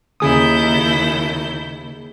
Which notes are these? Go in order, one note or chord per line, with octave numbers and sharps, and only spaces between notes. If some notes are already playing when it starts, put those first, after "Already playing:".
D#2 C#3 E4 G#4 D#6 G6